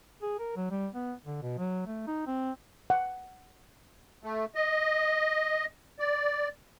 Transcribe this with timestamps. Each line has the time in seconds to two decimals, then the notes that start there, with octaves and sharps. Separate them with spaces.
0.22 G#4
0.40 A#4
0.57 F#3
0.71 G3
0.95 B3
1.26 D3
1.42 B2
1.58 F#3
1.87 A3
2.08 D#4
2.27 C4
2.90 F#5
4.24 A3
4.55 D#5
5.99 D5